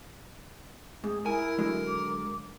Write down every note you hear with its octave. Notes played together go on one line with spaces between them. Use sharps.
G#2 G#4
E4 A#4 G#5
D3 F#3 G#3
D6